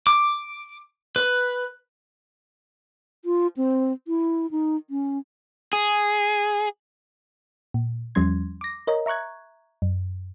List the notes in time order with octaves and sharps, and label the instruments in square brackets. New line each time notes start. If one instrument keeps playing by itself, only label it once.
[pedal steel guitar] D6
B4
[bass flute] F4
C4
E4
D#4
C#4
[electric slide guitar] G#4
[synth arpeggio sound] A#2
E2 F3 G3 C#4 C6 G#6
D6 A#6
A#4 C#5 D#5 A#5
E5 A#5 C#6 F#6 G#6
F#2